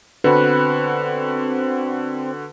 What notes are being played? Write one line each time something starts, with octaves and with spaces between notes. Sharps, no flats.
D3 C4 F#4 B4